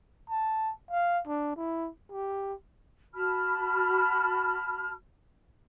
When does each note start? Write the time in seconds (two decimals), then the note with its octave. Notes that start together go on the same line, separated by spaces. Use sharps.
0.29 A5
0.91 F5
1.28 D4
1.57 E4
2.12 G4
3.14 F#4 A5 B5 F6